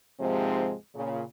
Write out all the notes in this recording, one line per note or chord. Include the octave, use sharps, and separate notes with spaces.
D#2 G#2 C3 F3 G#3 C4
A#2 C#3